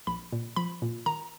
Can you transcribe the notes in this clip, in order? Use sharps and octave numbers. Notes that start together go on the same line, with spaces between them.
A#1 B5
A#2
F3 B5
A#2
D#3 A#5